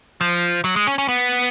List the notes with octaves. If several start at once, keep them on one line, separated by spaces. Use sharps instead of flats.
F3
F#3
G#3
C#4
C#4
B3